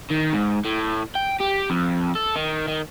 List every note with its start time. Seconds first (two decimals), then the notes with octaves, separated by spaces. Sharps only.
0.11 D#3
0.33 G#2
0.65 A2
1.16 G5
1.40 G4
1.70 F2
2.15 A4
2.36 D#3
2.68 D#3